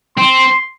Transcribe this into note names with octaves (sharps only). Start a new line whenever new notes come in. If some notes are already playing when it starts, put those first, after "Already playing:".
C4 C6